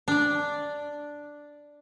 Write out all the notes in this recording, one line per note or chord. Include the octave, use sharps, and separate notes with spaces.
D4 D5